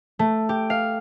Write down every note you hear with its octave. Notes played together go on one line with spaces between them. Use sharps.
A3
G4
F5